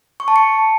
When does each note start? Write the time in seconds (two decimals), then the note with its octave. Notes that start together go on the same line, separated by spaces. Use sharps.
0.20 C#6
0.28 A5
0.36 C#7